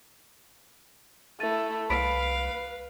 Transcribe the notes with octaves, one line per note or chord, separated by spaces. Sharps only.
A3 E4 A6 D#7
C2 B4 F5 B5 B6 D7